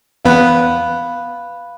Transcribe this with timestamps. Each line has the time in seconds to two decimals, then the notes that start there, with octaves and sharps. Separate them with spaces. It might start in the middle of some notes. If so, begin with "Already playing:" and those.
0.25 E2 B3 F5 B5 F#6